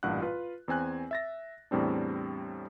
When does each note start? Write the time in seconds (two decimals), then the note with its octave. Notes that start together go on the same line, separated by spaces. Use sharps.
0.03 A1 G2 A#2 F#5 F#6
0.22 F4 B4
0.68 E2 C4 G#5 F#6
1.11 E5 A6 A#6
1.71 E2 A2 G3 C4 D4